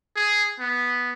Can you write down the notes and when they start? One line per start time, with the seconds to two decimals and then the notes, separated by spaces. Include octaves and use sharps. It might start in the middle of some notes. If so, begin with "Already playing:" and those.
0.16 G#4
0.60 B3